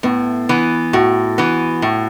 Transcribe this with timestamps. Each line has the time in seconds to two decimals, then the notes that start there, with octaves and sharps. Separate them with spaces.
0.03 A2 B3
0.49 E3 B3
0.93 A2 F#4
1.38 E3 B3
1.82 A2